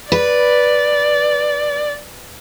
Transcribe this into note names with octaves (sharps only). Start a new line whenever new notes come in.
B4 D5